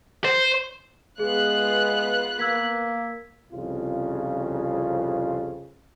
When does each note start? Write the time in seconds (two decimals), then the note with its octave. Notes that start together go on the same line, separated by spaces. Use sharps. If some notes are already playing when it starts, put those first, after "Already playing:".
0.25 C5
1.19 G#3 B3 F4 G#4 F#6
2.39 A#3 E6 G#6 B6
3.51 C2 F2 C#3 F4